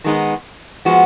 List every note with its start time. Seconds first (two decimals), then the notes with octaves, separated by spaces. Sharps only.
0.04 D#3 G#3 B3 D#4
0.85 F3 G#3 B3 F#4